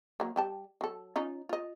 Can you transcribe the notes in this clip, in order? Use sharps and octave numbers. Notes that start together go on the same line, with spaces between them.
F#3 A#3
G3 G4 A5
F#3 A4
C#4 D#4 F4
F4 D#5